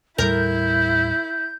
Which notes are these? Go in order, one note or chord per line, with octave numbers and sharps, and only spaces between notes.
D#2 A2 G3 E4 A#4 G6